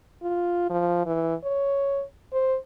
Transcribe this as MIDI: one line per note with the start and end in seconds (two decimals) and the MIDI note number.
0.22 0.66 65
0.70 1.03 53
1.06 1.35 52
1.44 2.03 73
2.33 2.57 72